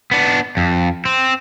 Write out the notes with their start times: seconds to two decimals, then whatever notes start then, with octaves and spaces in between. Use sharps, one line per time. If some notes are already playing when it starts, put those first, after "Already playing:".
0.11 B3 D4
0.57 F2
1.05 C4